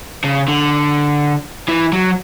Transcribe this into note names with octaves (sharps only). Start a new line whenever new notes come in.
C#3
D3
E3
F#3